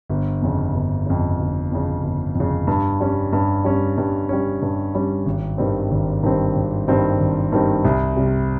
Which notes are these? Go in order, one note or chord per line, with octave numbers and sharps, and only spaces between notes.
G1
F2 C#3
G1
F2 C#3
G1
F2 C#3
G1
F2 C#3
G2
G3 C#4
G2
G3 C#4
G2
G3 C#4
G2
G3 C#4
G#1
G2 D#3 G3 C4
G#1
G2 D#3 G3 C4
G#1
G2 D#3 G3 C4
G#1
G2 D#3 G3 C4
C2
C3 G3